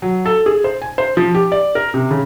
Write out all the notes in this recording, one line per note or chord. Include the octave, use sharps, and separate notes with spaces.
F#3
A4
G#4
C5
G#5
C5
F3
G4
D5
A#4
C3
C#3